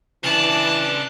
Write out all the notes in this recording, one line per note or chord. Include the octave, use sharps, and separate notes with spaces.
C#3 E3 D4 A5